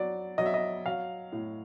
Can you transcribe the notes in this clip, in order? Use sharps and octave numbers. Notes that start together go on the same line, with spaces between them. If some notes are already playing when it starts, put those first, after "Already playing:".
Already playing: F#3 D5
F#3 D#5
E5
D#5
F#3 F5
A2